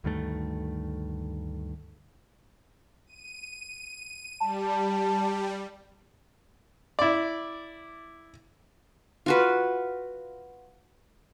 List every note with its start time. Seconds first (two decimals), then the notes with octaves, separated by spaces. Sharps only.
0.04 D2 G2 D#3 A3
3.07 D#7
4.40 G3 A5
6.99 E4 D5
9.26 F4 F#4 B4